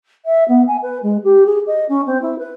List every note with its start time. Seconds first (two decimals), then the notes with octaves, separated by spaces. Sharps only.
0.25 E5
0.48 B3
0.67 G#5
0.82 B4
1.02 G#3
1.24 G4
1.46 G#4
1.67 D#5
1.89 C#4
2.06 C4
2.22 E4
2.38 B4